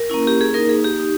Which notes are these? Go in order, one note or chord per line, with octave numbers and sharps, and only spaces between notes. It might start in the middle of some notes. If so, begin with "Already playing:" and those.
Already playing: A#4
A#3 C#4 E4
G4
G#4
A#3 D#4 A#4
G#4
G4
D#4